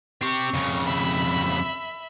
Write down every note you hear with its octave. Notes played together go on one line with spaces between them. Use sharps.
C4 G4 C#6
F2 C#3
E5 B5